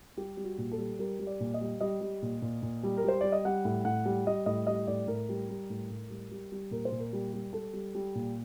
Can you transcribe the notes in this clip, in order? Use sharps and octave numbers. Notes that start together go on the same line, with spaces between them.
G3 G4
G3
F#4
A#2
A4
G3
G3 A#4
G3
D5
A#2
D#5
G3
G3 D#5
G3
A#2
A#2
A#2
G3
A#4
G3 C5
G3 D5
D#5
G3 F#5
A2
A2 F#5
G3
G3 D#5
A2 D#5
G3 D#5
A2 D5
A2 A#4
G3
G3
A2
A2
G3
G3
G3
A#2 A#4
C5
A#2
A#4
G3
G3
G3 A4
G3
G3
A#2